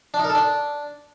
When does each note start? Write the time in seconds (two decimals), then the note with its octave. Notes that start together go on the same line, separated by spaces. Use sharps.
0.14 D4
0.19 D#4
0.24 A#4
0.30 A4
0.35 D4